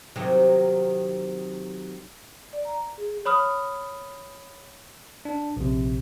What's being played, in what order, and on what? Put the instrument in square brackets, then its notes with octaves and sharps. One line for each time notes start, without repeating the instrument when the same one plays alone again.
[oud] C3 D#3 F#3
[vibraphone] D5
A#5
G#4
[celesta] C#5 B5 D#6 F6
[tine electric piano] D4
A#1 C3